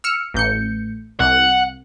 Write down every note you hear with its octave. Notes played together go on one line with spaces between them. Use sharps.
E6 F6 C#7
A1 G6 C#7
C2 F#5